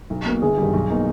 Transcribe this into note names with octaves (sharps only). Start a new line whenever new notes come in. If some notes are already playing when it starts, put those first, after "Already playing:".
B1
B2 A#3
G1 G#4
G2 D#3 G3
B1
B2 A#3 D#4